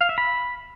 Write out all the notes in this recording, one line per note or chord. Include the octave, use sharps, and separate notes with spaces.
F5
E5
B5